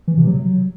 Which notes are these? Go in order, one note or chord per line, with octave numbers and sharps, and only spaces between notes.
E3
C3
F#3